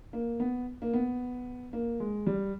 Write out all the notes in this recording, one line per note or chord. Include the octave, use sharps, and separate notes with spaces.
A#3
B3
A#3
B3
A#3
G#3
G3